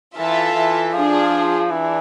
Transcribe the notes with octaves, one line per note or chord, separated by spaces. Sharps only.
E3 F4 A4 E5 A5
E3
F3 D4 F4 G#4
E3 D4